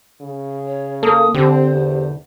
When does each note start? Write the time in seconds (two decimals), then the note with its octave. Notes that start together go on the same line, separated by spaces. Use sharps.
0.21 C#3
0.66 C#5
1.03 A#3 A4 A#4 D#6
1.34 D3 C4 G4 C5
1.71 E2